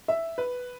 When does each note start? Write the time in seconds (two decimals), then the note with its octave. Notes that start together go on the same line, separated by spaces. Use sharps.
0.08 E5
0.38 B4